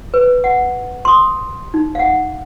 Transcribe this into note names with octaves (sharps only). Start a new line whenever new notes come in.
B4
F#5
C6 D#6
D#4
F5 F#5